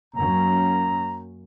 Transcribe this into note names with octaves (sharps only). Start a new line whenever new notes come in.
F#2 A#3 C#4 A#5